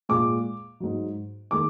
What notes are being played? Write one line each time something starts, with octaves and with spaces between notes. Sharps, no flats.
A#2 G#3 D6
G#2 F#3
D#3 G#3 D6